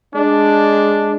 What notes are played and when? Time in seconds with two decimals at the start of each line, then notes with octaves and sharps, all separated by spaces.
0.13 G#3 D4